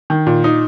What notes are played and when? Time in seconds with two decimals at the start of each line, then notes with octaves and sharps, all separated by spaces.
0.10 D#3
0.27 A#2
0.44 D#4